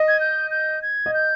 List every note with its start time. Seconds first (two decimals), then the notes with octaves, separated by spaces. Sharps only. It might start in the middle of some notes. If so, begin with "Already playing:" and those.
Already playing: D#5
0.08 G#6
0.20 G6
0.51 G6
0.82 G#6
1.06 D#5
1.14 G6